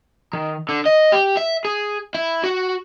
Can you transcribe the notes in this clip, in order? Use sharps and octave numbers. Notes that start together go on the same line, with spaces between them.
D#3
D3
D#5
G4
E5
G#4
E4
F#4